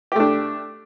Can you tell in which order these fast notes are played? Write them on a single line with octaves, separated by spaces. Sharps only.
G4 A3 D4